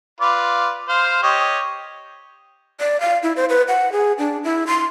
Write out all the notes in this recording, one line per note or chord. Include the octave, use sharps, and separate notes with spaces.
F4 B4 D5
C5 F5
G4 C#5 D#5
D5
F5
E4
C5
B4
F#5
G#4
D4
E4
C6